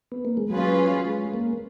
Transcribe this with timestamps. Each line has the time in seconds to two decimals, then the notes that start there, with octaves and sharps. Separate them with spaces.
0.12 B3
0.25 A#3
0.37 G#3
0.50 F#3 C#4 F4 G#4 B4
1.05 G#3
1.34 A#3